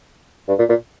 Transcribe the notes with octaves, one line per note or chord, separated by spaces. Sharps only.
G2
A#2
A#2